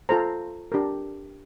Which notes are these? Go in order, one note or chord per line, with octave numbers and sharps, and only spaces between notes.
F4 A4 C5 A#5
D4 G4 A#4